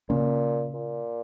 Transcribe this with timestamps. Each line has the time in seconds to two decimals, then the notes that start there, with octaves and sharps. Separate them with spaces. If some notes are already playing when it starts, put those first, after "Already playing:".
0.09 A#2 C#3 A#3 C#4
0.74 A#2